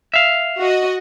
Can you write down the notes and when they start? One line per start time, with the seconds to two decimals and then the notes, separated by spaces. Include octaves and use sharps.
0.14 E5 F5
0.58 F#4 D#5